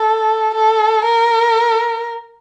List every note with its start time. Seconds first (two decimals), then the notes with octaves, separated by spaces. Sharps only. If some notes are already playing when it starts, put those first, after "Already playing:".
Already playing: A4
0.54 A4
1.05 A#4